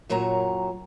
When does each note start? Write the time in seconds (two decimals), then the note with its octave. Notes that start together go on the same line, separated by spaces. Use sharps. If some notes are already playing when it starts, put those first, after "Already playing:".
0.09 F#2 A#2 F#3 C#5 A#5